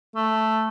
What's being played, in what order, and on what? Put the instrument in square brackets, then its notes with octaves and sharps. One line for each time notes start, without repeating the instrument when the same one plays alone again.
[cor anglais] A3